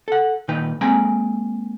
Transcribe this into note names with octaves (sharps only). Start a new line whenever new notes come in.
A4 F#5
A#2 D#3 D#4 B4 G5
G#3 A#3 C4 G5 G#5 A#5